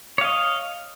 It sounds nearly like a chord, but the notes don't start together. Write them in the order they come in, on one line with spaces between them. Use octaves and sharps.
C#5 F5 D#5